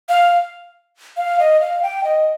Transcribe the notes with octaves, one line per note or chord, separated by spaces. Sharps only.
F5
F5
D#5
F5
G5
D#5